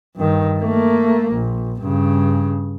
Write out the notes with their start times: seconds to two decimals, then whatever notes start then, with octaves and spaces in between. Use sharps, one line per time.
0.16 G2 D#3
0.60 A3 A#3
1.31 A#1
1.82 G2 C#3